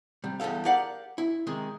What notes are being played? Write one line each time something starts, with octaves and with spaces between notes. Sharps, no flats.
C3 G3
E2 G2 G3 A4 F5
G4 A#4 D5 F5 F#5
E4
C3 D#3 G#3